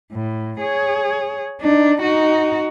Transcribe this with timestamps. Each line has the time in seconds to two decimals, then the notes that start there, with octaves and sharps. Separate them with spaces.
0.13 A2
0.61 G#4 C#5
1.61 D4 D#4
2.01 D#4 F#4